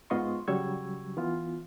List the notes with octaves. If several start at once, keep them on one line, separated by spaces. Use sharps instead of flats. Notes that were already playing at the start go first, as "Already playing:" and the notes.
G#2 B3 F4 D#5 C6 C#6
C#3 F#3 G3 C#6 E6 G#6
E3 B3 F4